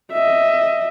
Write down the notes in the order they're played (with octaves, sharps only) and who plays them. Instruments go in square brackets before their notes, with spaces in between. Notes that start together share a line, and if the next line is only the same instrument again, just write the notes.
[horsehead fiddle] D#5 E5